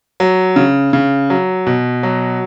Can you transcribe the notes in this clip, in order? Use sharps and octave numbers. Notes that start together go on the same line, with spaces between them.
F#3
C#3
C#3
F#3
B2
F#3